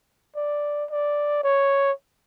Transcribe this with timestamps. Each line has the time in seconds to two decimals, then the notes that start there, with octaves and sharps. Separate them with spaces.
0.36 D5
0.90 D5
1.43 C#5